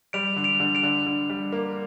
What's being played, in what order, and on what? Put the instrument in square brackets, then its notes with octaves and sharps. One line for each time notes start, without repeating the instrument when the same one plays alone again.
[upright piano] G3 [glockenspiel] D7 F7
[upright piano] D3
[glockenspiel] D7 F7
[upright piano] D3
[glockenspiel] D7 F7
[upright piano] D3
D3
G3
A#3